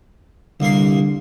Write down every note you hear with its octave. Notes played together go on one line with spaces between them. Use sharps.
C2 D3 A#3 C6